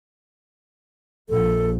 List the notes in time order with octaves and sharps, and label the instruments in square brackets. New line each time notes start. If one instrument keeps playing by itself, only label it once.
[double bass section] A#1 [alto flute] A4